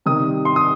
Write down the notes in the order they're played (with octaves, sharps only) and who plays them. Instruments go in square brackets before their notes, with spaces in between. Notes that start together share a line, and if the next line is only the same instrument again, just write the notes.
[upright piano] C3 D#3 G3 D#6
C6
D#6